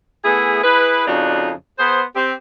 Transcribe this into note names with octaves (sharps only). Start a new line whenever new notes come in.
A3 B3 E4 G#4
E4 G#4 B4
F2 C#3 D4 D#4 F#4
B3 G#4 C5
C4 G4